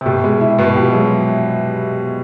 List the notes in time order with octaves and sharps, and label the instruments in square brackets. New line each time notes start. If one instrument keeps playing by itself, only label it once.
[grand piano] C3
[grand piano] B2 [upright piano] G4
[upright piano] G#3
E4
[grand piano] B2 [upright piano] B3
[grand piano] F3 [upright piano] G4
[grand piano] F#3 [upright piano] G#3